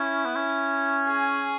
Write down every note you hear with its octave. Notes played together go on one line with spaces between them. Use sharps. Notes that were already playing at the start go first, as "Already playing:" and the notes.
Already playing: C#4 E4
B3
C#4
G#4